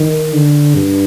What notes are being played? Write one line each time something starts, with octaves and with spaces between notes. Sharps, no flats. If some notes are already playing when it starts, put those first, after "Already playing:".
Already playing: D#3
D3
G2